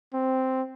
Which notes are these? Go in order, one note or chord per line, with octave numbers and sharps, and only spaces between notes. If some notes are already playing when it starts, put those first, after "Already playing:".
C4